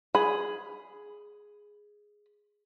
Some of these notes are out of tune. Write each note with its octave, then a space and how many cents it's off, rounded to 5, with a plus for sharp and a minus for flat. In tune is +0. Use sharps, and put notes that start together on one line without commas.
G#4 +0 B5 +5